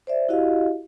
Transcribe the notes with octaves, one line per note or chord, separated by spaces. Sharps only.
C5 D5 E5
E4 F#4 G4 D#5 F5